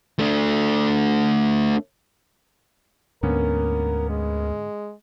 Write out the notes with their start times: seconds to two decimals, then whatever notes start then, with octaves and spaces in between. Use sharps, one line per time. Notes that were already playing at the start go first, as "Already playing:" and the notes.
0.19 A3 D4
3.23 D2 G#2 D3 A#3 B3 C#4 A#4
4.09 G#3